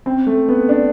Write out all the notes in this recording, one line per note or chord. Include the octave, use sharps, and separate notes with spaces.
C4
A3
B3
D4